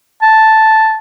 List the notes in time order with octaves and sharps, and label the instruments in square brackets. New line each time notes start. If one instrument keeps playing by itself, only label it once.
[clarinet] A5